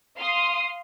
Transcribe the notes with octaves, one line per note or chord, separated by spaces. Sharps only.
F5 C6 D#6